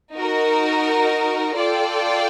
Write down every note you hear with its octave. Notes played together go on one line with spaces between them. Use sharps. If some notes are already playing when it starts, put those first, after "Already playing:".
D#4 F#4 A#4
F4 A4 D5 G5